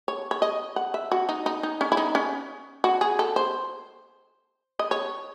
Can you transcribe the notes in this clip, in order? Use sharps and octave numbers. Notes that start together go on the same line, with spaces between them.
C#5
C#5
D#5
F#5
E5
F#4
D#4
D#4
D#4
C#4
E4
D#4
C#4
F#4
G#4
A4
C5
D#5
C#5